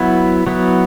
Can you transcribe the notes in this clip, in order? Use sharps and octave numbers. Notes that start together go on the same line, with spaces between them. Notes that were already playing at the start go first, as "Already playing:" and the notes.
Already playing: F#3 B3 E4
F#3 B3 E4